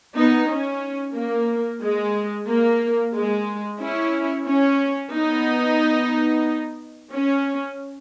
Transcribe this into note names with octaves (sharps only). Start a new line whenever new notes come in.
B3 D#4
C#4
A#3
G#3
A#3
G#3
C#4 E4
C#4
B3 D#4
C#4